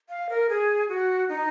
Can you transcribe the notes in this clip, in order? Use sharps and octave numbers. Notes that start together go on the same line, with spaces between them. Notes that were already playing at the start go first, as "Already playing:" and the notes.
F5
A#4
G#4
F#4
D#4